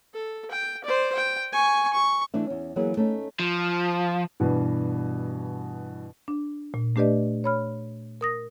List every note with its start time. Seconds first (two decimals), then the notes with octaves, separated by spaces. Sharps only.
0.14 A4
0.51 G5
0.84 C5 D5
1.15 G5
1.53 G#5 C#6
1.93 C#6
2.34 E3 A3 D4 E5
2.46 E2 C#4
2.76 E3 F#3 A#3 B3 G#4
2.97 A3 C#4 D#4
3.39 F3
4.40 G2 B2 E3
6.28 D4
6.74 A#2
6.96 A3 D4 G4 B4 D5 D#5
7.44 C#5 B5 F6
8.21 A#4 D#6 A#6